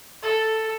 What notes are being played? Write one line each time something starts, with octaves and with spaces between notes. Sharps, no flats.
A4